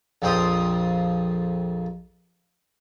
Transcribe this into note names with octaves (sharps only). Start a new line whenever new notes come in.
A#1 F2 F3 G5 C6 D#6